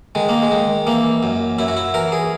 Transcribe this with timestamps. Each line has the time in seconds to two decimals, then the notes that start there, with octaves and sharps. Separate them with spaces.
0.15 D#3 G#3
0.29 A#3
0.42 G#3
0.51 D#3
0.87 E3 A#3
1.23 F#2
1.59 F#2 E4
1.68 F#4
1.77 E4
1.94 E3 A#4
2.12 G#4